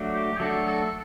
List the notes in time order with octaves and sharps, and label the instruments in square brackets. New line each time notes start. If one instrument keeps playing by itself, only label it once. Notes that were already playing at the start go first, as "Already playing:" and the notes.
Already playing: [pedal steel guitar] F#3 A3 D4 F#4
[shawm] G4
[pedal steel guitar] F#3 A3 D4 F#4 [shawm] A4
[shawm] A4